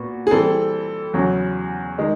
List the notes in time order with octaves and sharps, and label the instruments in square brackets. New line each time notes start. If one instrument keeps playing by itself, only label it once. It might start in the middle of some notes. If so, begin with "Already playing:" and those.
Already playing: [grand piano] A#2 B3 F#4
[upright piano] G#4
[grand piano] E3 G3 C4 [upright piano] A4
[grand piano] E2 C#3 F#3
D#3 G#3